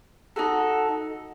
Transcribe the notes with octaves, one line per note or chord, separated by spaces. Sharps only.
D#4 F#4 A4